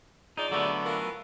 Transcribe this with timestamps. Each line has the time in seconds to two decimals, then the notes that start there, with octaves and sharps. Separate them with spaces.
0.37 F3 G#3 D#4 D5
0.52 D3 F#3 A3 B3
0.85 E3 F4 A#4